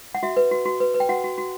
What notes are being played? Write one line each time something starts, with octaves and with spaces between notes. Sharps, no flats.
F#5
F#4 E5
B4
F#4
F#4
B4
B4
G5
F#4 F#5
F#4
F#4